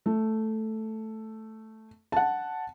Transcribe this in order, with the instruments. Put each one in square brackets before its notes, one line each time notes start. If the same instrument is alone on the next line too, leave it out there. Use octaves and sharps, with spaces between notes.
[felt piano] A3
F#5 A5